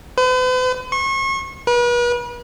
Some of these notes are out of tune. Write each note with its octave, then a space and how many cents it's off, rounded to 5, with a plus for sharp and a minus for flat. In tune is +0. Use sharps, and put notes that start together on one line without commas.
B4 +45
C#6 -35
B4 -40